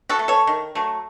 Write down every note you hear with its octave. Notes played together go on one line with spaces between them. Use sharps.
F#4 A4
A3
A4 C#5
D#3
F#3 A3